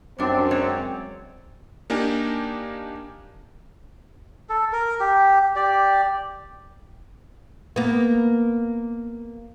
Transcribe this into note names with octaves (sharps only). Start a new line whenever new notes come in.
F#2 G3 C4 D4 C5
G#3 C#5 D5
A#3 D4 D#4 G4 A#4 G#5
A4
A#4
G4
G4 D5
A#3 B3